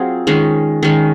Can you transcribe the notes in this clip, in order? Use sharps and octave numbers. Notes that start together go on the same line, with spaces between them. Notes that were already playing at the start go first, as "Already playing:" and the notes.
Already playing: F#3 C4 F4 G#4
D#3 G#3 C#4
D#3 G#3 C#4